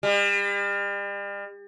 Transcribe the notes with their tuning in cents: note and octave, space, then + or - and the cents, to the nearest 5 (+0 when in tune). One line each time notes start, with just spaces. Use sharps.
G3 +40